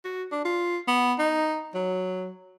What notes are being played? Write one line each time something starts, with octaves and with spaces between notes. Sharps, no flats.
F#4
D4
F4
B3
D#4
F#3